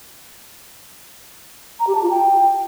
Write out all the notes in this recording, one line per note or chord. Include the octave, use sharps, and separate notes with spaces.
A#5
G4
A5
F4
G5